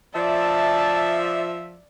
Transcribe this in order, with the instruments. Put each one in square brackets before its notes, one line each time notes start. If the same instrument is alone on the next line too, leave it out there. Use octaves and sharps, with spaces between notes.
[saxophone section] F3 E5 [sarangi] D5 [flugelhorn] A5